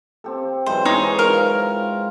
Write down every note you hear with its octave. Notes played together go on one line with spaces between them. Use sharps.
C4 G4 A4
G#2 E3 F#3 C5
D#4 G#4 C#5
F4 A#4